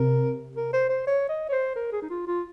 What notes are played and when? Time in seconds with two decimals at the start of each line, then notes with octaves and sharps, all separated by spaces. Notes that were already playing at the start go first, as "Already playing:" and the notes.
Already playing: C3 A#4
0.56 A#4
0.73 C5
0.90 C5
1.07 C#5
1.29 D#5
1.49 C#5
1.52 C5
1.76 A#4
1.92 G#4
2.02 D#4
2.10 F4
2.27 F4